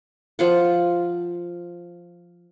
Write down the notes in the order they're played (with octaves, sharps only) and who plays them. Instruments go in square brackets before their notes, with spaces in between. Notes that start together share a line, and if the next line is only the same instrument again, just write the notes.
[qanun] F3 F4 F#5